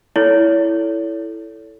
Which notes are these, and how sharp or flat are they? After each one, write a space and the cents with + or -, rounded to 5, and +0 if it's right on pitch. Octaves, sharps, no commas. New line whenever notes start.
E4 +0 A4 +0 C#5 +35